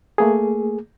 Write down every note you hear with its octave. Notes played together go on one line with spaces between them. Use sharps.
A3 A#3 G#4